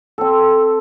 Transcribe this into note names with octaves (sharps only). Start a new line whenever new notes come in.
C4 A4